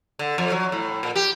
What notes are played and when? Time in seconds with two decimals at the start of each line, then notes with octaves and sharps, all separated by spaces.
0.19 D3
0.38 F2
0.52 F#3
0.72 A2
1.03 A#2
1.16 G4